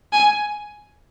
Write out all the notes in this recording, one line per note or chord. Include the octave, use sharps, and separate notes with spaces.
G#5